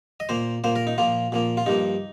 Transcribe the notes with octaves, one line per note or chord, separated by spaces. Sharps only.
D#5
A#2 A#3 C5
A#2 A#3 C5
A#4
D#4
A#2 F3 A#3 F4
A#2 F3 A#3
F4
G2 F3 A#3 D#4